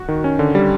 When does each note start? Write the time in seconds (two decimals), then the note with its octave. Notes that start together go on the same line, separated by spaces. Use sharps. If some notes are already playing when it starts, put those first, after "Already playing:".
Already playing: F#4
0.08 D#3
0.24 C#4
0.39 D3
0.55 G3